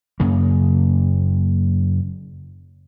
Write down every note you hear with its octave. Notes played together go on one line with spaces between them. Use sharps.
F#2 C#3 A#3